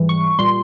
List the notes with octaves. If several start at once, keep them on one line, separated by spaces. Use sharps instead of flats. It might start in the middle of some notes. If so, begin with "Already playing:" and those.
Already playing: G#2 E3 G3
C#6
A#2 G3 C6